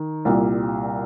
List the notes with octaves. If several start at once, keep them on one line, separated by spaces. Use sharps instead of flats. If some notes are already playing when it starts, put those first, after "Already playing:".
Already playing: D#3
C2 A#2 G3